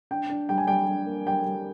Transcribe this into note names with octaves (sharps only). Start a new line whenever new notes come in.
D4 G5
D4
G3 G5
G#5
G3 G5
G3
A#3
G3 G5
G3